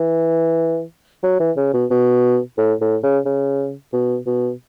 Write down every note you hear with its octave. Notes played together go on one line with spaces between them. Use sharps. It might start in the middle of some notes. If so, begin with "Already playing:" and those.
Already playing: E3
F#3
E3
C#3
B2
B2
A2
A2
C#3
C#3
B2
B2